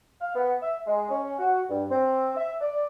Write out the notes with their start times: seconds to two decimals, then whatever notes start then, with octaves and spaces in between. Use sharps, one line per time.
0.21 F5
0.35 B3
0.62 E5
0.87 G#3
1.09 C#4
1.38 F#4
1.69 G2
1.90 C4
2.36 E5
2.60 D5